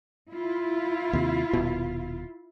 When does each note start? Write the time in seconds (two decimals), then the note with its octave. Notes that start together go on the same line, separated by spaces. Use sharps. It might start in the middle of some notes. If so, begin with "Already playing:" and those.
0.31 E4 F4
1.13 D#2 C3
1.53 D#1 B2